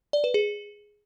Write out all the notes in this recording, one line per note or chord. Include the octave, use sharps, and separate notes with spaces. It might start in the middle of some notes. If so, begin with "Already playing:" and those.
D5
B4
G#4